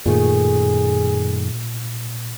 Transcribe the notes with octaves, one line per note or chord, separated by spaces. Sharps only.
F#2 A#2 D#3 A3 G#4